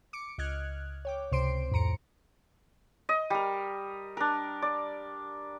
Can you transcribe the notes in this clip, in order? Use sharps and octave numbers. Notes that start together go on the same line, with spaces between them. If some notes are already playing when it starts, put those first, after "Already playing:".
D6 C#7 D7
C#2 D#5 F6 F#6 G#6
C#5 G5 D6
C#2 C3 C5 C6 C7 D7
F2 A2 A#5 C#7 D7
D#5
G3 A#4
D4 A#4
D5